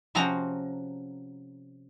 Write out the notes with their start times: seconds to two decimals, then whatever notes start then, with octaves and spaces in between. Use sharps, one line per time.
0.15 C3 F3 C4 C#4 F#4 A#5